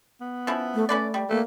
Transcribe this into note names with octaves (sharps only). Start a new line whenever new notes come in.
B3
F3 C#4 E4
A3
A3 C#4 B4 D5
G3
A3 A#3